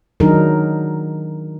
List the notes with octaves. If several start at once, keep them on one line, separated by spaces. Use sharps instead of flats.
D#3 F#3 D4 D#4 G#4 A#4